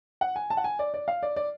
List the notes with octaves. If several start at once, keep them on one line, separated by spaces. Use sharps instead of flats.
F#5
G#5
A5
F#5
G#5
D5
D5
F5
D5
D5